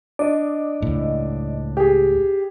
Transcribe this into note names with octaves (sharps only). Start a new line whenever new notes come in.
D4 D5 D#5
C#2 A2
G4 G#4